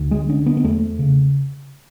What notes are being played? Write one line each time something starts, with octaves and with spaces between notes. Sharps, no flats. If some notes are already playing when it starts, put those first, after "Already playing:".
Already playing: D2
G#3
D3 C#4
B3
B3
E2 A3
C#3